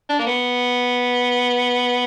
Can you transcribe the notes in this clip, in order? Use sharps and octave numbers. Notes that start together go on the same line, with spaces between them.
D4
A#3
B3